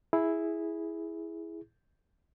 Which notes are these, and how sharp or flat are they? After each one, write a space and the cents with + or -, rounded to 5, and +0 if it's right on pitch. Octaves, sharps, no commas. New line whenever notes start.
E4 +0 G#4 +0